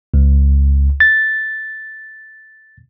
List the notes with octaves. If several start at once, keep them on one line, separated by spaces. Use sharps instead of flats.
C#2
A6